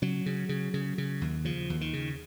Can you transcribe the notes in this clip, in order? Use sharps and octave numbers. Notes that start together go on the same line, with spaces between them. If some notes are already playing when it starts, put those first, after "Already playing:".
C#3 F#3
C#3
C#3
C#3
C#3
D#2
C#3 F3
D#2
D#3
C#3